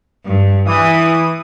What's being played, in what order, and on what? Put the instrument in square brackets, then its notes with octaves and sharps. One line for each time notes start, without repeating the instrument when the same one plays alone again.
[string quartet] G2
[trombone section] E3 [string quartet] D#6